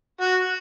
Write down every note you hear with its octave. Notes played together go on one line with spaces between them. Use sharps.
F#4